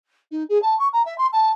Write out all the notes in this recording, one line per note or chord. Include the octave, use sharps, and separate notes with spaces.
D#4
G#4
A5
C#6
A#5
E5
C6
A5